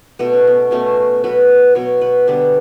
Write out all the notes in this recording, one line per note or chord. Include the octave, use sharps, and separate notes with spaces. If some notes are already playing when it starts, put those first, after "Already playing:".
B2 A3 B3
C#4
B3
B2 A3 C#4
B2 F#3 B3 B4
B2 F#3 B3 C#5
B4
D3 G3 B3 D4